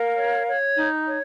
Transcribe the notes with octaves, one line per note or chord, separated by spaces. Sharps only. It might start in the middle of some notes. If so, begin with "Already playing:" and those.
Already playing: A#4 F5
C#5
C#5
D#4
C#5